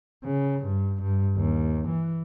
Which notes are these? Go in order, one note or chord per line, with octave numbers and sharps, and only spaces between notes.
C#3
G2
G2
D#2
E3